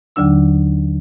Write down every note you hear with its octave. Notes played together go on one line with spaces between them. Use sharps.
D#2 D3 F#3 D4 E6